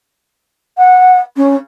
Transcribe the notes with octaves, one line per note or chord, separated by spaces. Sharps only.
F#5
C#4